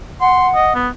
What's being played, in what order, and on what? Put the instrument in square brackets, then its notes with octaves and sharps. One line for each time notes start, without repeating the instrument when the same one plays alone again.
[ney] F#5 [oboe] C6
[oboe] D#5
B3